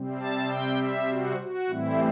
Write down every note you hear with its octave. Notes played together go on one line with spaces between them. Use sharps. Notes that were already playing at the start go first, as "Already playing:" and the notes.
Already playing: C3 G3 C4
A5
G5
E5
F#4
F#4
A2 E3 G3 C4 E4